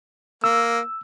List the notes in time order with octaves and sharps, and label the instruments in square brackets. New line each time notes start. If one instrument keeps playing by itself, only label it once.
[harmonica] A#3 [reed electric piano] E6